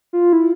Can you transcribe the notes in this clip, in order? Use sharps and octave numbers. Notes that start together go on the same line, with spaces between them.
F4
E4